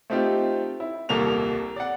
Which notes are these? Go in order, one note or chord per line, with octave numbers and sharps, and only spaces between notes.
A3 C4 D#4 F4 G4
E4
D#1 C2 A#3 A4 F7
D5 F#5